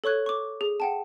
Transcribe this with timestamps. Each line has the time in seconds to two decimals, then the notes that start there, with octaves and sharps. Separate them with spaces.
0.04 A4 C#5 C#6 F#6 G#6
0.26 C#6 D6
0.61 G#4
0.80 F#5 G5 A5